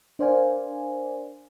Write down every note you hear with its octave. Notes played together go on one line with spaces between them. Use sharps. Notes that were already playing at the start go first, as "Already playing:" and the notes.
D4 A#4 C5 D5 F5 G#5